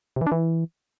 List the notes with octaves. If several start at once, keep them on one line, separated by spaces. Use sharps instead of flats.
C3
E3
D4
E3